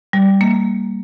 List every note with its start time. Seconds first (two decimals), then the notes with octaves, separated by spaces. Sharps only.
0.13 G3
0.41 A#3